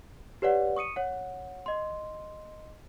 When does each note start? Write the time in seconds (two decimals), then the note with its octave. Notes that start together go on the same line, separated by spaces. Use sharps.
0.42 G4 B4 C#5 D5 F#5
0.77 C#6 D#6 C#7 D#7
0.96 C#5 F#5
1.66 D#5 C6